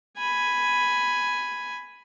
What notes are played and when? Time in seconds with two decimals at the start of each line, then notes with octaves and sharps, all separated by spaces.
0.18 G#5 B5